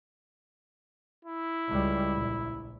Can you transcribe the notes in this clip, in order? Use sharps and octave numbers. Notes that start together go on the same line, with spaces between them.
E4
C#2 G3
A#1